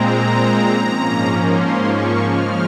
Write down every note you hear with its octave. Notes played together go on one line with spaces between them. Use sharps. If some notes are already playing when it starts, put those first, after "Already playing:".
Already playing: A#2 G#3 C4 A#5
G#2 F3 A#3 C#4
C6
C#6
C#3 F3 G#3 F6